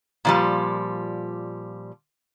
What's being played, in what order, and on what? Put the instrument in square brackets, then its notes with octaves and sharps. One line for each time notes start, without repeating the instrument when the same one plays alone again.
[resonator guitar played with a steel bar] A#2 F3 G3